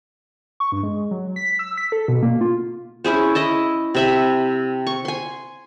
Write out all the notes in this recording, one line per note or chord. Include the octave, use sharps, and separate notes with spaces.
C#6
G2
G#3
F#3
B6
E6
B6
A4
B2
A#3
F4
C#4 E4 G#4 C5
E4 D#5 A5
C3 E5 B5
C#6
G#5 C6